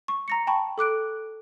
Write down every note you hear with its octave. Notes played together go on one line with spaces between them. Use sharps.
C#6
A#5 A#6 C#7
G5 A5 B5 C#6
A4 D6 F#6 D7